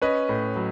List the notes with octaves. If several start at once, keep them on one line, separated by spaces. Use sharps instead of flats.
C#4 B4 D#5
A2
F#3